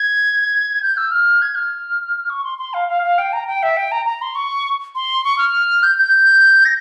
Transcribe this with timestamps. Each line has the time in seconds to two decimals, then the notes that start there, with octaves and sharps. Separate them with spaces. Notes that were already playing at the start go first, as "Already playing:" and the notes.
Already playing: G#6
0.82 G6
0.97 E6
1.11 F6
1.42 G#6
1.55 F6
2.30 C#6
2.44 C6
2.58 C6
2.74 F5
2.88 F5
3.03 F5
3.18 G5
3.33 A#5
3.47 G5
3.63 E5
3.77 G5
3.92 A#5
4.06 A#5
4.22 C6
4.35 C#6
4.95 C6
5.24 C#6
5.38 F6
5.83 G6
5.98 G6
6.65 A#6